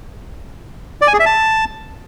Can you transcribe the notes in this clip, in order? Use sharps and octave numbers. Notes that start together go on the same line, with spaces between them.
D5
G#5
G#4
E5
A5